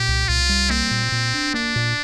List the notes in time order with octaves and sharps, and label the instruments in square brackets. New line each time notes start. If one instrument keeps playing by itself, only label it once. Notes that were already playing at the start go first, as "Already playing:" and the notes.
Already playing: [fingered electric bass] A#2 [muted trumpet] G4
[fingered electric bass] C2
[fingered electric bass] C2 [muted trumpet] F4
[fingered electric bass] G3
[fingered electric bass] A#3 [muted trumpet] C4
[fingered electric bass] A#2
A#2
D4
[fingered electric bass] A#3 [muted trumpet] D4
[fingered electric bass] A#2